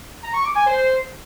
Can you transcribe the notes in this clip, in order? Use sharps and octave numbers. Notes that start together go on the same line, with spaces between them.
A#5
C#6
D6
G#5
C5